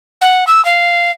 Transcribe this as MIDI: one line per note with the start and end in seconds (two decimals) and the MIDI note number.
0.21 0.44 78
0.47 0.63 88
0.65 1.11 77